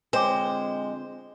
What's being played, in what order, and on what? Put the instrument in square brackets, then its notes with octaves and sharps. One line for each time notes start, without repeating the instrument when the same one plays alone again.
[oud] D3 F3 C4 [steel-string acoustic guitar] G#3 [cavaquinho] C5 [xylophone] C#5 G5 D6